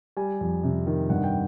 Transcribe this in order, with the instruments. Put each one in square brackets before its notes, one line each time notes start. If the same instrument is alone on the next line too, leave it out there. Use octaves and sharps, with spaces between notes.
[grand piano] G3 G#5
F2
C3
D#3
G2 F#5
G5